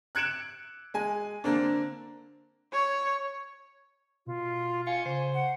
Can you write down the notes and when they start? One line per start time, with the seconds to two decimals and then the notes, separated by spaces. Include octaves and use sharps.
0.15 F#6 G#6 C#7 D7 E7 F#7
0.94 G#3 G#5
1.44 D3 A#3 C4 D4
2.73 C#5
4.26 B2 F4
4.87 F4 G#5 C#7
5.06 C#3 C5
5.34 F#5